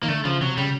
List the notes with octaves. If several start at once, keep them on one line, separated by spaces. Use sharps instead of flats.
D#3 A#3
D3 A3
C#3 F3
C3 F#3
C#3 G3